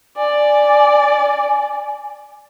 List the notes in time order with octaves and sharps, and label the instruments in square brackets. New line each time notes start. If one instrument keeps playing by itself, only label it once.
[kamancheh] D5 [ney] G#5